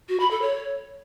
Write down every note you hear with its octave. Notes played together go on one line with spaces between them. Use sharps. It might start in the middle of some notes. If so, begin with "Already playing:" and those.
F#4
B5
A4
C#5